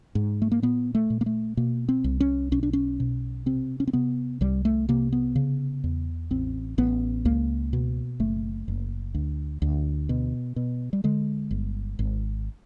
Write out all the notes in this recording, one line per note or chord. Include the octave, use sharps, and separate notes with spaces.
G#2
A3
A#3
A#2 B3
A3
A#2
A#3
A3
B2 A#3
C4
C2
C#4
B1 C#4
D4
C#4
B2
C3 C4
C#4
C4
C3 B3
C2 G3
A3
C3 A#3
B3
C#3
E2
A1 C4
A1 B3
C#2 A#3
B2
F#1 A3
F#1
D2
D2
B2
B2
G3
D3 G#3
G1
G#1